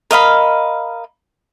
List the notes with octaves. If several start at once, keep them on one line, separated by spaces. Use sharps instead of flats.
A#4 D#5 F5 B5